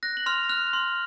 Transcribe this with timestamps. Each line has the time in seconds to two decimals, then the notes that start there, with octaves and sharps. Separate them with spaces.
0.03 F#6 A#6
0.17 F#7
0.26 C6 F6 F7
0.49 F6 F#6 F7
0.73 C6